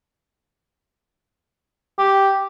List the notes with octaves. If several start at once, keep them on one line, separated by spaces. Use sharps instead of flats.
G4